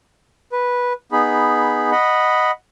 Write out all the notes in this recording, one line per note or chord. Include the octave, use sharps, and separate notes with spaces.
B4
B3 D#4 G#4 B5
D#5 F#5 B5